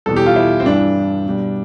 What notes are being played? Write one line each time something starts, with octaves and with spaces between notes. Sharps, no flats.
E2 B2 G3 A4
G4
F4
E4
C4
G2 E3 G3 D4
B2 G3